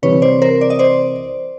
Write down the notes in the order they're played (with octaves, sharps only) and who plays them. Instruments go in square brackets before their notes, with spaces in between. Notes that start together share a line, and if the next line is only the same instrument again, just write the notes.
[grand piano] C3 E3 G3 [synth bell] B4 C#5
[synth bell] C5 D5
A#4 C5
D5
D#5
C5 D5